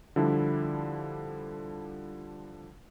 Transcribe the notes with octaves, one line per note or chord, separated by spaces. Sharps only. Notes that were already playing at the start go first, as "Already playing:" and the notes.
D3 F3 G3 D4 E4